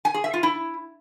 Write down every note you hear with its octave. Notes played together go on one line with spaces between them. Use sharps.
G#5
G#4
E5
F4
E4